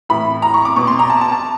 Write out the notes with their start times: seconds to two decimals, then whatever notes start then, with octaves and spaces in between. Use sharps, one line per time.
0.09 A2 E3 B5
0.42 A#5
0.54 C#6
0.65 D6
0.76 B2 C#6
0.87 C6
0.99 A#5
1.10 A5
1.21 A5
1.32 A5